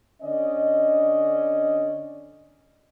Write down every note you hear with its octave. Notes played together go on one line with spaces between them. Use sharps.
D3 C#4 D5 D#5